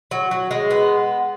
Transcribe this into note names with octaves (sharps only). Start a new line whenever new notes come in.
F#3
F#3
G#3
B3